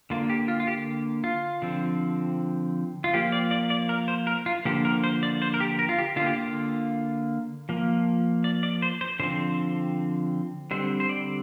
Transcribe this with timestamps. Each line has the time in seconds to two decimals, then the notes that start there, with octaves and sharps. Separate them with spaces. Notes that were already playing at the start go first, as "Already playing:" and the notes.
0.10 D3 A#3 F4
0.30 G4
0.48 F4
0.60 F4
0.67 G4
1.24 F4
1.62 D3 F3 C4
3.04 F4
3.13 F3 A#3 G4
3.32 D5
3.51 D5
3.70 D5
3.89 A#4
4.08 C5
4.27 A#4
4.46 F4
4.65 D3 F3 A#3 G4
4.85 A#4
5.04 C5
5.23 D5
5.42 C5
5.54 A#4
5.60 G4
5.79 A#4
5.89 F4
5.98 G4
6.16 D3 F4
6.21 A#3 G4
6.35 F4
7.69 F3 A#3
8.44 D5
8.63 D5
8.82 C5
9.01 C5
9.20 D3 F3 C4 C5
10.71 D3 G3 C4 C5
11.00 C5
11.09 D5